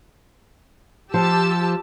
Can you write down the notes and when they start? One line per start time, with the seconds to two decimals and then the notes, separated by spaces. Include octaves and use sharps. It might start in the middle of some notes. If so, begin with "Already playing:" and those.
1.14 F3 G4 A5 E6